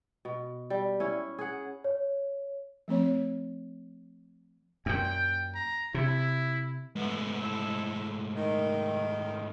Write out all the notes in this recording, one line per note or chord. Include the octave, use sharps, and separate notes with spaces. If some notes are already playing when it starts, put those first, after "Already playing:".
B2
G3
C#4 E4
G#4 F#5
C#5
F3 A3 C4 C#5
F#2 A#2 G5
A#5
C3 E4
G#2 A3 B3
E4 A4
D#3